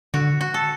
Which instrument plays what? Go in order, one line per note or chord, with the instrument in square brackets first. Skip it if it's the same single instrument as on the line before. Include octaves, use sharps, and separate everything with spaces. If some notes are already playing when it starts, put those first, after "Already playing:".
[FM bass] D3 [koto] F#4
[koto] F#4
A4